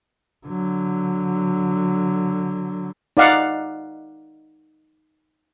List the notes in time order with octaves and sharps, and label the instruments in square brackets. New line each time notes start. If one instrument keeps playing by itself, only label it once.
[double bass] D3 F#3
[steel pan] D#4 D5 F5 F#5